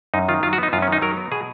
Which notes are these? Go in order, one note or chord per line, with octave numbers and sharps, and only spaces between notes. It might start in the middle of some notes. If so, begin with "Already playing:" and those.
F#2 D#4
D#3 F4
F#3 F4
F#4
B3 D#4
F#2 F4
C#4
D#3 D#4
F#3 A#4
B3
B2 G#4